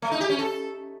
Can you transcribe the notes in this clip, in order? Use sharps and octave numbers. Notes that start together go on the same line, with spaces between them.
A3
D#4
G4
C#4
A4